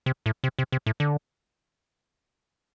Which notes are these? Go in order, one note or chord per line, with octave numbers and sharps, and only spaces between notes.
C3
A2
C3
C3
C3
A2
D3